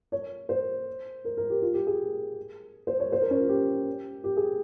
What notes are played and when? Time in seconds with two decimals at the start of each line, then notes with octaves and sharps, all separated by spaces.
0.12 C#5
0.49 C5
1.25 A#4
1.37 A#4
1.50 G4
1.62 F4
1.74 G4
1.87 G#4
2.87 C5
3.00 C#5
3.12 C5
3.21 A#4
3.30 C#4
3.40 F4
3.49 G4
4.24 G4
4.37 G#4